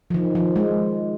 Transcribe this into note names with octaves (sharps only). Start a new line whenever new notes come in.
F3
D#3
F3
G#3